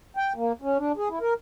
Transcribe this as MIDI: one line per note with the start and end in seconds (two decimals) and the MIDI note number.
0.17 0.33 79
0.36 0.52 58
0.62 0.78 61
0.78 0.92 62
0.97 1.09 68
1.09 1.19 64
1.21 1.34 70